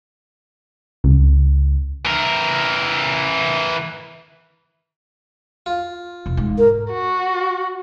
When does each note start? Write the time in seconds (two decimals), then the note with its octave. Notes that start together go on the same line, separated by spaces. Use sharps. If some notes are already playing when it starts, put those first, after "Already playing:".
1.04 C#2
2.05 E3 A#4
5.66 F4
6.26 E1
6.37 G#2
6.58 A#4
6.92 F#4